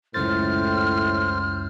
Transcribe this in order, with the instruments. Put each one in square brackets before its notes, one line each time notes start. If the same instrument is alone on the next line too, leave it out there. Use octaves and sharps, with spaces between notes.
[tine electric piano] C#2 F#2 A6 [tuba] A2 [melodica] C5 [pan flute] F6